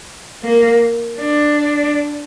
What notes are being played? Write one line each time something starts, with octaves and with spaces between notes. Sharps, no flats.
A#3
D4